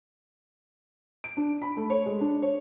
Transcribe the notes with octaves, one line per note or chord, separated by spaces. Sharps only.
D7
D4
B5
A3
C#5
G#3
D4
C#5